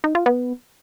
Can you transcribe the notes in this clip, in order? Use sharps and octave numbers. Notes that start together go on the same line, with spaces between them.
D#4
F4
B3